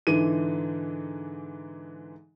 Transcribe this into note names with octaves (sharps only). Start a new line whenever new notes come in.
G#2 D3 E3 D#7